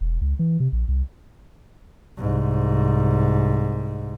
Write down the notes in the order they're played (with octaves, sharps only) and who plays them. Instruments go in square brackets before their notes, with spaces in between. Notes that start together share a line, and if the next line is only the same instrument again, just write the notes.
[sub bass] E1
C#2
E3
C3
A#1
C2
[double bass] C2 G#2